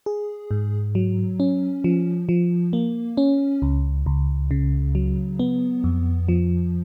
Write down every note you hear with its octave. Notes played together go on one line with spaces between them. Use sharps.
G#4
G#2
F#3
C#4
F3
F3
A#3
C#4
C#2
C#2
C#3
F#3
B3
F2
F3